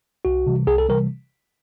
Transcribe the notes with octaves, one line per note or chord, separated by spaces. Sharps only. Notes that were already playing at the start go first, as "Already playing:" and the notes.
C2 F#4
C3 E3 G3
C2 G#4
A4
C3 E3 G3 A#4